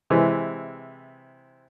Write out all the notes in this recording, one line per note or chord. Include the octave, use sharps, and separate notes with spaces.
C3 E3 G#3